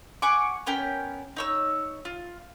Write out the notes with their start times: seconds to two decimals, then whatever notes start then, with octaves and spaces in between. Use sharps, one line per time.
0.22 F#5 G#5 C#6 D6
0.66 B3 C#4 A#4 G5
1.36 D#4 C#5 E6
2.05 F4